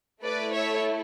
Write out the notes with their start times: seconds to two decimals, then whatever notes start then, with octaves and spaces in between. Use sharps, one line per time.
0.24 A3 E4 A4 B4 D5
0.54 C#5 E5